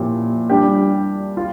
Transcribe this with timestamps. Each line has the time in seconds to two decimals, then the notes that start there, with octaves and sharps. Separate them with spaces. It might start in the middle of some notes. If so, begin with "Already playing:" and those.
Already playing: A#2 F3 C#4 E4 G4
0.50 G3 D4 G4
1.37 F4